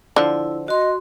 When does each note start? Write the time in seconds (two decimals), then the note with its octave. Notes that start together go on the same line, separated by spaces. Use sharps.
0.16 D3 F3 E4
0.68 F#4 D#5 C6